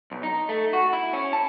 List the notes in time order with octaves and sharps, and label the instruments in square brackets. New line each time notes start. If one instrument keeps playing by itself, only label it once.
[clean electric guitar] B1
D#4
A3
F#4
E4
C#4
A5